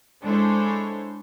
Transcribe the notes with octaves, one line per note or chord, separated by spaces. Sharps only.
G#3 D4 E4 A4 C5 C#5